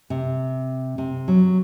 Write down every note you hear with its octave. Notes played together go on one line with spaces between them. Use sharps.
C3
C3
F#3